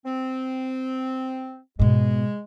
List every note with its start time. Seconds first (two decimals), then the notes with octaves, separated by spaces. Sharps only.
0.05 C4
1.79 G#2 B2 G#3